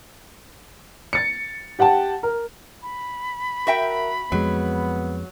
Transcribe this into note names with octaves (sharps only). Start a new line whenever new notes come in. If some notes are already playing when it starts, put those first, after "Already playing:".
A6 C#7
G4 F#5 G5 A5
A#4
B5
F#4 A#4 E5 G5
F2 F#3 G#3 B3